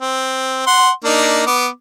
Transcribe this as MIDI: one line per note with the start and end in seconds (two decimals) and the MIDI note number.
0.01 0.62 60
0.67 0.90 78
0.67 0.90 84
1.04 1.43 58
1.04 1.43 62
1.04 1.43 63
1.46 1.68 59
1.46 1.68 86